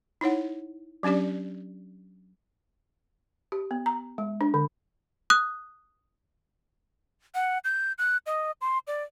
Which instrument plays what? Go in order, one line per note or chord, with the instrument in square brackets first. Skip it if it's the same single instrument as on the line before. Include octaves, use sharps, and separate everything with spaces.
[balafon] D#4 E4 C#5 F#5
F#3 C#4 D4 G4 D5
G4
B3
A#5
G#3
D4
D3
[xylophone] D#6 F#6
[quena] F#5
G6
F#6
D#5
C6
D5